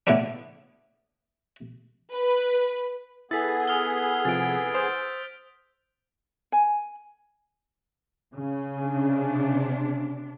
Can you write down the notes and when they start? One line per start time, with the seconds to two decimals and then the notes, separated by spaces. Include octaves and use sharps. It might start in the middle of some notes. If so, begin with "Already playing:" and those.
0.07 A2 D3 A3 B3 D4
2.13 B4
3.31 B3 E4 G#4 A4 E6 A6 B6
3.68 D#6 F6 G7
4.25 C3 F3 A6 D7
4.75 C5 D#6 G6
6.52 G#5
8.35 C#3
8.80 C3 D4